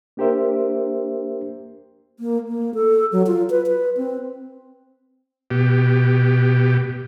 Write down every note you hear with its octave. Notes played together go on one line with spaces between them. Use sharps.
A#3 D4 G4 A#4 C5 E5
A#3
A#3
A4
F#3
F4
B4
B4
C4
B2 G4